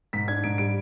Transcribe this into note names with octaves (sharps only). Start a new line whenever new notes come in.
G#2 B6
D4 G#6
G#2 D7
G3 D7